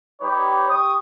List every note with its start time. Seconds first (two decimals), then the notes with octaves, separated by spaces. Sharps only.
0.22 G3 D#4 G4 B4 C#5
0.70 G4 C#6 D#6